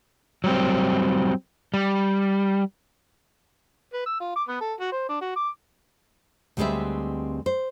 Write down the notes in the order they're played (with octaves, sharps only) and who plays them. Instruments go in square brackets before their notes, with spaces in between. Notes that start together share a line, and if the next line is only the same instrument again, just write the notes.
[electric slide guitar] F#3 G3 C4
G3
[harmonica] B4
E6
F4
D6
B3
A4
F#4
C5
D4
F#4
D6
[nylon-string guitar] D2 G3 G#3 C4 B4 E5
C5